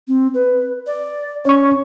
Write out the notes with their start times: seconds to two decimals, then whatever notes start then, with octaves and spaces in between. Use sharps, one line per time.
0.08 C4
0.34 B4
0.87 D5
1.45 C#4 C#5 C#6